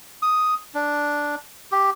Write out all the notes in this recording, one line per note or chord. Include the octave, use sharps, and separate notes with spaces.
D#6
D4
G4